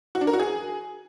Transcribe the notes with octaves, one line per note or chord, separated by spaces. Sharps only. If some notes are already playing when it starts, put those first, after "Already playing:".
F#4
D4
A#4
F#4
G#4